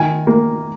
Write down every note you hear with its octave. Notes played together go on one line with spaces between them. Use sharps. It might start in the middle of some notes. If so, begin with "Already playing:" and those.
Already playing: D#3 G#5
A#3